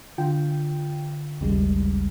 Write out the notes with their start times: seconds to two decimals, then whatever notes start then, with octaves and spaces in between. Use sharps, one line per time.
0.18 D3 F4 G5
1.41 A1 D#2 C#3 G3 G#3